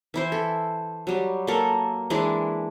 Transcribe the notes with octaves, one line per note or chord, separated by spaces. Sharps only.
E3 E4 C5
A4
F#3 G3
A#3 A4 A#4
E3 G#3 D4 E4